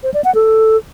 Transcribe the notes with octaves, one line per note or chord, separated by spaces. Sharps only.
C5
D5
F#5
A4